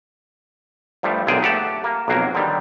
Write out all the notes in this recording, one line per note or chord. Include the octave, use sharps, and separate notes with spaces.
G2 F3 G3 A3
B1 F#2 A#2 D3 G#4 G5
A3 G4 F#5 A5
A#3
B1 F2 F#3 A#3
D3 D#3 G3